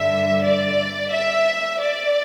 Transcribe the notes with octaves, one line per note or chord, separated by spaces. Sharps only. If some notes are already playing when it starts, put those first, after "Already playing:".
Already playing: G2 D3 E5
D5
E5
D5